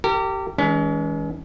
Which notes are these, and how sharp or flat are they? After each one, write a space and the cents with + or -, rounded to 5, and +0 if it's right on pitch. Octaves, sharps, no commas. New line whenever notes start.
G4 -15 A#4 -40
E3 -40 G#3 +0 C#4 +35